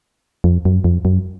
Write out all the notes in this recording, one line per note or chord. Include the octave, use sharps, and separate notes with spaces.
F2
F#2
F2
F#2